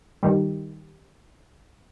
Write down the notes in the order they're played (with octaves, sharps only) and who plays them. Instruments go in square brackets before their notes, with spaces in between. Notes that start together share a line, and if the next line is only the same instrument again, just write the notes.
[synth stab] G2 D#3 G3